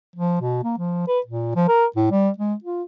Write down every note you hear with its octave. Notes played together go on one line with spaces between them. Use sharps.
F3
B2
A#3
F3
B4
A#2
F3
A#4
A2
G3
G#3
F4